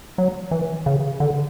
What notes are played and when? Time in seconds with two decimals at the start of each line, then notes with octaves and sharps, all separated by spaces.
0.18 F#3
0.51 E3
0.86 C#3
1.20 D3